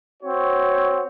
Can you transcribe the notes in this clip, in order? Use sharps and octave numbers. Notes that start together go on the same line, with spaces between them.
C4 F#4 C#5